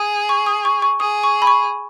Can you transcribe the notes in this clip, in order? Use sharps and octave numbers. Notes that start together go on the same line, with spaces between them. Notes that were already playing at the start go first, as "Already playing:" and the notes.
Already playing: G#4 D#6
C#6
D#6
C#6
C#6
G#4 D#6
C#6
B5
C#6